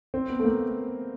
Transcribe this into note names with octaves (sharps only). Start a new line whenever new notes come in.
C4
B3
A3
A#3